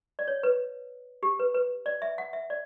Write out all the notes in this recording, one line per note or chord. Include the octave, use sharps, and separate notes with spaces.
D5
C#5
B4
G4
B4
B4
D5
E5
F#5
E5
D5